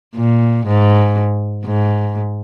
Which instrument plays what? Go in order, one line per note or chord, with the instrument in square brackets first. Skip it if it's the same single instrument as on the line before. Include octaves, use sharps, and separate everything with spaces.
[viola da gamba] A#2
G#2
G#2